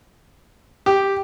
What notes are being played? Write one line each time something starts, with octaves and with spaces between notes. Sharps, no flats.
G4